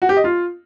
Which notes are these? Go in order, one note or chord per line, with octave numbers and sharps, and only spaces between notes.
F#4
G4
D#5
F4